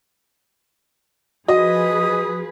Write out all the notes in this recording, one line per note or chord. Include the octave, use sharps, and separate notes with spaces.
F3 F#4 G#4 B4 D#5 D#6